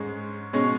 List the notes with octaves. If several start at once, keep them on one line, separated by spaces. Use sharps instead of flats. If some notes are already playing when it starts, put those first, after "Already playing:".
Already playing: G#2 G#3 C#4
B2 G#3 C#4 C#5